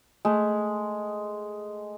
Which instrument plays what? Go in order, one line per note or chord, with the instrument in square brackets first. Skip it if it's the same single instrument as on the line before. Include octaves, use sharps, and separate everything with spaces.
[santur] G#3 [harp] A3